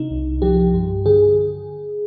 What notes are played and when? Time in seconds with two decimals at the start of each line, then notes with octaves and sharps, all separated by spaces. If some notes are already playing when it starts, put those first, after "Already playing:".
Already playing: C3 D#4
0.11 C2
0.42 F3 G4
0.74 G2
1.06 D3 G#4